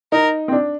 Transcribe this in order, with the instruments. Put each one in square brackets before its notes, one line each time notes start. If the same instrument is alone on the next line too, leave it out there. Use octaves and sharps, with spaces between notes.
[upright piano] D#4 [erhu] A#4
[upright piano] C4
D4